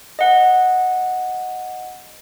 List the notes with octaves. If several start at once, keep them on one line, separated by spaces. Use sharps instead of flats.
D#5 F#5